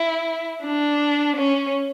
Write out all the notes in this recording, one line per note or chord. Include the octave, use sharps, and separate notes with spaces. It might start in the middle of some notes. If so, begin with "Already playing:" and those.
Already playing: E4
D4
C#4